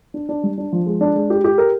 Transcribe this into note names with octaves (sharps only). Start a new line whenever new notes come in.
D4
D4
G3
D4
F3
G#3
D4
G#3
G4
G4
A#4